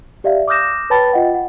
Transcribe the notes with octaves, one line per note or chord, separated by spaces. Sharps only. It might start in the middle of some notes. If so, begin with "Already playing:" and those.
G4 D5 E5 F5
D6 D#6 F6 G6 A#6 E7
B4 C#5 G5 A5 B5 A6
F4 D#5 F#5 G5
F#5